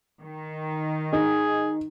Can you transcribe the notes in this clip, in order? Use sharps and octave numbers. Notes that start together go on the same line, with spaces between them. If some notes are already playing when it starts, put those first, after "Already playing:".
D#3
D#4 G#4